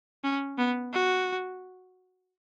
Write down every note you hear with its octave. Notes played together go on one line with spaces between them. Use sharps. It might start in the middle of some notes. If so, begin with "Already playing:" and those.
C#4
B3
F#4